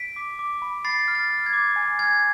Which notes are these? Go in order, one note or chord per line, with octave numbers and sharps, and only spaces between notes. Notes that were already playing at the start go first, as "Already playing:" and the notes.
Already playing: B6 D7
D6
D6
B5
B5 A6 C7
F6
A6
F6
G#6
D6
G#5
F6 G#6